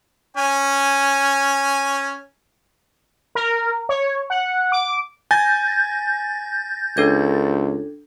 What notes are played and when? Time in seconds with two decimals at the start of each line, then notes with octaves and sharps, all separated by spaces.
0.37 C#4 G#5
3.35 A#4
3.89 C#5
4.30 F#5
4.72 D6
5.31 G#5 G6 A6 A#6
6.97 C#2 D4 A4 G#6